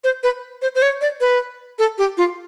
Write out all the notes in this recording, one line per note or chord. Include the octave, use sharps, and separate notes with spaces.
C5
B4
C5
C5
C#5
D5
B4
A4
G4
F4